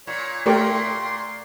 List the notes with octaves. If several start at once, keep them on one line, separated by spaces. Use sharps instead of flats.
A#2 C#5
A#2 A3 G4 A#4 D5 G5 C6 C#6